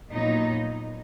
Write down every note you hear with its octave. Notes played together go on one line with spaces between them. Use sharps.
A#2 F#3 B3 D#4